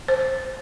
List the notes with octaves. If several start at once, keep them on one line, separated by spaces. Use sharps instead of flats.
C5